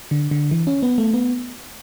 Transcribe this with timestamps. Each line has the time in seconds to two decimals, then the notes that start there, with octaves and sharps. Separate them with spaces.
0.11 D3
0.31 D3
0.51 E3
0.67 C#4
0.83 B3
0.98 A3
1.13 B3